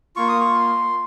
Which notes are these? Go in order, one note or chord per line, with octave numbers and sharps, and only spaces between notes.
A#3 F4 C#6
D#6
C#6
C6